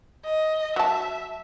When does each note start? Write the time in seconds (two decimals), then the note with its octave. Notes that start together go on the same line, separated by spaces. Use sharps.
0.25 D#5
0.76 F#3 E5 A5